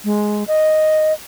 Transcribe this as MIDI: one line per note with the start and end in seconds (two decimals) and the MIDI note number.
0.05 0.44 56
0.48 1.13 75